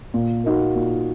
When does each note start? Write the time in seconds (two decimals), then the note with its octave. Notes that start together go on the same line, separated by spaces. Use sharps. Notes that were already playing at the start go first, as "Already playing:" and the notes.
0.14 A#2
0.44 A#3 D#4 F#4
0.75 A#2